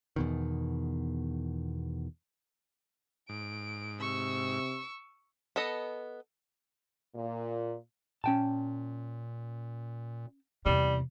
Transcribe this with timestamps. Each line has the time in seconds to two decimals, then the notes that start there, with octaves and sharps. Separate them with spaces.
0.16 E2 B2 D#3
3.29 G#2 D7
4.01 C3 C#6 E6
5.56 B3 A4 D#5
7.15 A#2
8.24 A#2 C#4 G5 A5
10.66 E2 C3 G3